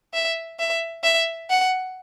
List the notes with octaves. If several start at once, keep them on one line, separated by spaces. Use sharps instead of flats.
E5
E5
E5
F#5